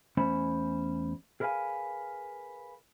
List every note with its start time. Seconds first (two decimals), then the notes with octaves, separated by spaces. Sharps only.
0.17 E2 A3 C#4 C5 B5
1.40 G#4 A#4 B4 D5 F5 G#5